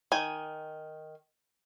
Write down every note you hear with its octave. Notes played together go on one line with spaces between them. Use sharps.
D#3 G#5